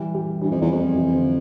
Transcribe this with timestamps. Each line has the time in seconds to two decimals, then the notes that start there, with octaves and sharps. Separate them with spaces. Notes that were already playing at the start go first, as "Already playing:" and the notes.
Already playing: E3 G3
0.15 E3 G3
0.42 G2 E3 G3
0.51 F2
0.61 E2
0.71 F2
0.95 C3 E3
1.14 D3 F3